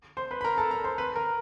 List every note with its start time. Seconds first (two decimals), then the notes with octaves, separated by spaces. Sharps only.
0.17 C5 C6
0.31 B4 B5
0.41 B5
0.44 A#4 A#5
0.58 A4 A5
0.71 A#4 A#5
0.84 C5 C6
0.98 B4 B5
1.16 A#4 A#5